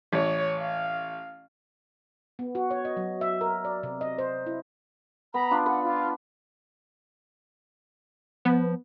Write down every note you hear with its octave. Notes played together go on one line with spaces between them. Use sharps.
A1 C#5
F5
B3
F#4
C#5
D#5
F#3
E5
A#4
D5
C3
D#5
C5
E4
B3 A#5 B5
D4 F4
B4 D5 F#5
F4
F3 B3